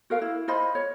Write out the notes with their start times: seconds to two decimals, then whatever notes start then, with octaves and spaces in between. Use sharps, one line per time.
0.10 F#4 A#4 F5
0.22 E4
0.48 F4 C5 D#5 B5
0.75 C#5